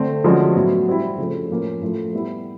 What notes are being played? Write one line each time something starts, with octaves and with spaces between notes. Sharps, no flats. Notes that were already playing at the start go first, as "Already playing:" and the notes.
Already playing: D3 A3 C4
D3 F3 G#3 C#4 F#4
A2 F#3 B3
G3 C4 E4
C#3 F3 A3
A2 F3 A#3 C#4
A2 F3 A3
G3 B3 E4